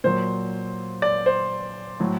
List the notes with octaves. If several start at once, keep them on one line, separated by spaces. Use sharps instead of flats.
A#2 F#3 C5
D5
C5
A2 F#3